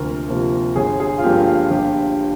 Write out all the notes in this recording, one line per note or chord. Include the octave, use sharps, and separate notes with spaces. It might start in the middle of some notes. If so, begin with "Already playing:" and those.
Already playing: D2 C3 F3 A#3 A#4
C3 F3 A#3
G1 G#4
G#4
F4
G2 F3 A#3 G4
F4
G1 G4